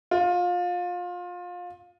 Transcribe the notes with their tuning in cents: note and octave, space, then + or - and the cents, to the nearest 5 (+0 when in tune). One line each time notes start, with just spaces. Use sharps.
F4 +25